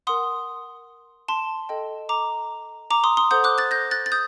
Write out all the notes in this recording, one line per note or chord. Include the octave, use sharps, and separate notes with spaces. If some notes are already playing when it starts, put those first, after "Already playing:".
A#4 F#5 C6 D#6
A5 C6
A4 D#5 G5
A#5 D6
A#5 D6
C6 D#6
C6 D#6
A4 C5 F#5 D#6 G6
D6 F#6
F#6 A6
G6 A#6
F#6 A6
A6
D#6 G6